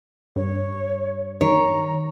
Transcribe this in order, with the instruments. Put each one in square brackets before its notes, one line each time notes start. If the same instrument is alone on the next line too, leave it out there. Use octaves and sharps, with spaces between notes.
[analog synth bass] G2 [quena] C#5
[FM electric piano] D#3 [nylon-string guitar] C#5 [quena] A#5